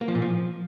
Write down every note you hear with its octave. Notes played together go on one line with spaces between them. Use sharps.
A#3
F3
A#2
F3